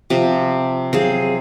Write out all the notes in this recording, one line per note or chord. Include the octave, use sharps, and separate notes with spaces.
C3 F3
F#3 C4 G#4 F5